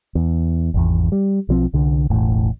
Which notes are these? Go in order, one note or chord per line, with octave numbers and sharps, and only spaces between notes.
E2
G#1 E2
G3
B1 F3 C4
C2 D3
E1 A1 A2